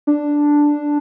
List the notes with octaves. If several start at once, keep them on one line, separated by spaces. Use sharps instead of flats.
D4